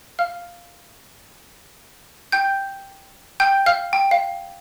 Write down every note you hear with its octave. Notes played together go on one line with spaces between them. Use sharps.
F5 F6
G5 G6
G5 G6
F5 F6
G5
F5